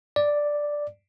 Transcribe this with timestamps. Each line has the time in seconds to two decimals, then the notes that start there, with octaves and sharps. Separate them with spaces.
0.16 D5